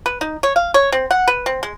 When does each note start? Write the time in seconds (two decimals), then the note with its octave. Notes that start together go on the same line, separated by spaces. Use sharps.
0.06 B4
0.21 D#4
0.43 C#5
0.56 F5
0.74 C#5
0.92 C4
1.11 F#5
1.28 B4
1.46 C4
1.63 G#3